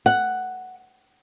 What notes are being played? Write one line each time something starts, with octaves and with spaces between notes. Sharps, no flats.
F#5